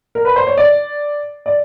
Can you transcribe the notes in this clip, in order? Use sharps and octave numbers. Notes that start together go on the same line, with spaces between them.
A#4
B4
C5
C#5
D5
D5